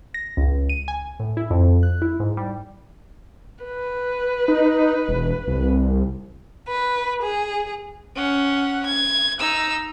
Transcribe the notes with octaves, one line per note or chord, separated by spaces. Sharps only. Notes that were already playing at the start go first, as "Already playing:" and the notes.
A#6
C#2
D#7
G#5
A2
E4
F2
F#6
E4
G#2
G3
B4
D#4
E1
C2
B4
G#4
C#4 F#5
G#6
D#4 E6